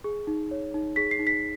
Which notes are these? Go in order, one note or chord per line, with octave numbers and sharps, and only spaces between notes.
G#4
D#4
C#5
D#4
G#4 B6
C7
D#4
B6